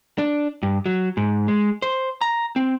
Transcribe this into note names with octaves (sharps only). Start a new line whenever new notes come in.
D4
G2
F#3
G#2
G#3
C5
A#5
C4